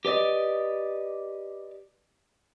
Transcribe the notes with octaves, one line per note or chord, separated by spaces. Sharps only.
G4 B4 D5 D#5